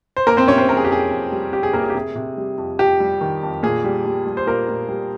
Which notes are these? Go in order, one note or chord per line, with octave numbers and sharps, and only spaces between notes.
C5
F2 A#3 A#4
C4 C5
C3 C#4 C#5
C4 C5
F2 A#4
G#4
G4
F2 G#4
F2
G3
F2 G4
G#4
C3 A#3 A#4
G#4
G4
C3 G#4
C3
G3
F2
F2 G4
G3
D#3
F2
A#2 G#4
G3
G3
G3
C5
A#2 A#3 A#4
A#2
G3